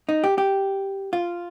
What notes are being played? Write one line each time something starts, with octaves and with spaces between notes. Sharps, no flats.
D#4
G4
G4
F4